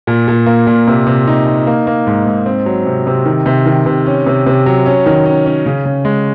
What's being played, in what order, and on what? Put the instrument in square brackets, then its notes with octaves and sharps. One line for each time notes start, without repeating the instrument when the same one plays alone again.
[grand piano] A#2
A#2
A#3
A#2
C3
C3
D#4
D#4
A#3
A#3
G#2
G#2
C4
F#3
C3
C3
D#3
C3
D#3
C3
C#4
C3
C3
F#3
C#4
D#3
C#4
C#4
C#3
C#3
G#3